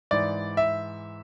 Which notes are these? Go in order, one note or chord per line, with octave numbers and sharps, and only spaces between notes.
G#2 E3 D5
E5